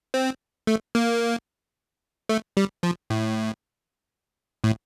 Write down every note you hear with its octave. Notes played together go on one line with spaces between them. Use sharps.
C4
A3
A#3
A3
G3
F3
A2
A2